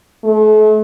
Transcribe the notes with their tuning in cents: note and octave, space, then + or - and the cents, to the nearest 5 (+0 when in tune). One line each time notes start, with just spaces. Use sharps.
A3 -40